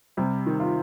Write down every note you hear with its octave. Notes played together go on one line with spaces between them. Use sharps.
C3 G3
D#3
F4